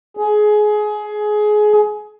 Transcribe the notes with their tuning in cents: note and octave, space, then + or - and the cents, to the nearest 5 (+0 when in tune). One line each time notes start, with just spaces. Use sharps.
G#4 +20